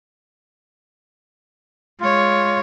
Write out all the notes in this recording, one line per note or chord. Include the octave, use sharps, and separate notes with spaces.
G#3 F4 C#5